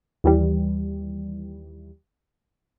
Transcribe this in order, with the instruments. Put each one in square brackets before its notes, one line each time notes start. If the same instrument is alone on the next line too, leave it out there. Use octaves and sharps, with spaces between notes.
[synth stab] D#2 E3 G3